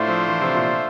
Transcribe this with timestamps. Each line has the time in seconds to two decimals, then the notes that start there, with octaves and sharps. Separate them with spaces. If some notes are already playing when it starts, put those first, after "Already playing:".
Already playing: A2 A3 D4 F4 C5 E5
0.08 F3
0.28 E3
0.42 C3
0.55 A#2